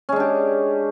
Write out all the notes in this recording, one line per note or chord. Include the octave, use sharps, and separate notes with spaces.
G#3 C#4 D4 G4